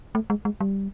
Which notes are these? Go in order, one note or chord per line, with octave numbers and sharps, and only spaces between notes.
A3
G#3
G#3
G3